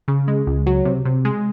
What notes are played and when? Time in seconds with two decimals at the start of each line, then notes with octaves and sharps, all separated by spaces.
0.08 C#3
0.28 G#3
0.47 C#2
0.67 F#3
0.85 C3
1.05 C3
1.25 G#3